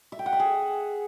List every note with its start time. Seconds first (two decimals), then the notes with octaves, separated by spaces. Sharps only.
0.12 E5
0.19 G5
0.26 F#5
0.33 E5
0.40 G#4